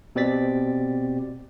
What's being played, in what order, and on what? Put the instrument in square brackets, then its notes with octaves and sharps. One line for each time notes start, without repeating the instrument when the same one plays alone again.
[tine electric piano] B2 C4 G4 D5 A6 B6